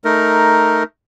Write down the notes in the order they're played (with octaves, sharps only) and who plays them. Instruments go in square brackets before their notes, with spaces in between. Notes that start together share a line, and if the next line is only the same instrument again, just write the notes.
[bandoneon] A3 D#4 A#4